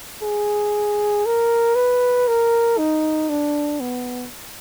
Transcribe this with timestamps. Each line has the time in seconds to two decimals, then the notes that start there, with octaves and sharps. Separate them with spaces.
0.23 G#4
1.26 A#4
1.76 B4
2.28 A#4
2.78 D#4
3.29 D4
3.80 B3